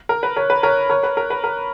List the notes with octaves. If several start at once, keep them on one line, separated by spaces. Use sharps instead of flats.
A#4
B4
A#4 C#5
B4
A#4 C#5
A#4 C#5
B4
A#4
B4
A#4